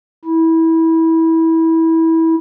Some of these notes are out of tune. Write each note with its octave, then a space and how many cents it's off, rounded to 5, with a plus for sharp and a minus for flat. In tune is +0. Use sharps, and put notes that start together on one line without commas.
E4 -20